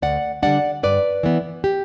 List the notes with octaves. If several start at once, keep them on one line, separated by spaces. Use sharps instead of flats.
D2 D5 F#5
D3 G3 D4 D5 F#5
G2 B4 D5
E3 B3
G4